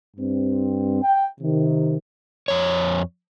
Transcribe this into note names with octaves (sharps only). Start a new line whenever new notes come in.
G2 C4
G5
C3 D#3
F2 C#5